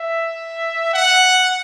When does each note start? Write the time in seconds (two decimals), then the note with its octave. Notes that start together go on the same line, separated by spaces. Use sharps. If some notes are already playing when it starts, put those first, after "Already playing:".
Already playing: E5
0.93 F#5